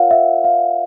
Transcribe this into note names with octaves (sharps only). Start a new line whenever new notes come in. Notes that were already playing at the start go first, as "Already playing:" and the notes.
Already playing: F4 A#4 C#5 F5 F#5
E5
F5